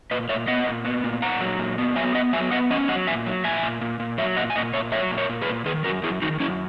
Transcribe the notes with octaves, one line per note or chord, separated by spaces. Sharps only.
A#2 B4 D#5
A#2 C#5 E5
B3 D#5 F#5
A#2
B3
A#2
A#2 F#5 A#5
F#3
A#2
B3
F#3 E5 G#5
B3 D#5 F#5
F#3 E5 G#5
B3 D#5 F#5
C#4 D#5 F#5
F#3 D#5 F#5
A#2 E5 G#5
F#3
A#2 E5 G#5
A#2
A#2
A#2
F#3 C#5 E5
A#2 D#5 F#5
G#5
A#2 D#5 F#5
A#2 C#5 E5
F#3 C#5 E5
A#2
A#4 C#5
A#2
G#4 B4
A#2
D#3 G#4 B4
F#2 F#4 A#4
F#2 E4 G#4
D#3 D#4 F#4
F#2 C#4 E4